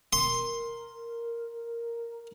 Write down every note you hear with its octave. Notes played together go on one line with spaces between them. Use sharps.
A#4 C6